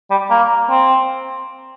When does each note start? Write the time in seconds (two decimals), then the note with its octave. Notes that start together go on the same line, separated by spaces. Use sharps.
0.10 G3
0.30 A#3
0.70 C4